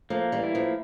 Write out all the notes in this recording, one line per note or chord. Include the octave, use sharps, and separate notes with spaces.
F3 A3 A#3
E3 G3
E4
F3 A3